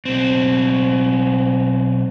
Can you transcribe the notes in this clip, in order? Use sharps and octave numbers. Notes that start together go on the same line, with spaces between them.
B1 C4